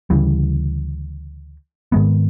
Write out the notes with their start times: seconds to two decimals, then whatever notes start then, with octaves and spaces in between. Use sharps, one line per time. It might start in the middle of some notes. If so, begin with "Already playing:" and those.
0.10 D2 C#3 E3 G3
1.92 G#2 D#3 G#3 B3